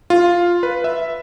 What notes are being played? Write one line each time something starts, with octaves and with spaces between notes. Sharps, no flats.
F4
B4
E5